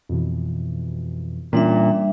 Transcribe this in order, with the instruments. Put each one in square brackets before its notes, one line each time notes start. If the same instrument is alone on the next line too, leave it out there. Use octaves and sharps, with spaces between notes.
[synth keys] F2 B2 E3
[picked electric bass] A#2 [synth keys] E3 C#4 F4 [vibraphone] G3 D4 E5